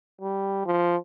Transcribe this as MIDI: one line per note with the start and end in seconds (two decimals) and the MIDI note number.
0.21 0.62 55
0.66 0.97 53